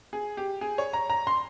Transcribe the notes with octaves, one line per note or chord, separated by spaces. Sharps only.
G#4
G4
G#4
C#5
A#5
A#5
C6